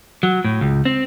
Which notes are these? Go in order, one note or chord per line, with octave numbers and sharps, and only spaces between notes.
F#3
A2
C#2
C4